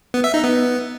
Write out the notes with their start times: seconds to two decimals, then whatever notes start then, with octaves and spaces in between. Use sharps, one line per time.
0.14 B3
0.24 E5
0.34 D#4
0.44 B3